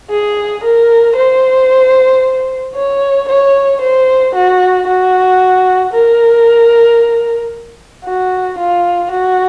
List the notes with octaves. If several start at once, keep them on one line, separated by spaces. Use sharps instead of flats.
G#4
A#4
C5
C#5
C#5
C5
F#4
F#4
A#4
F#4
F4
F#4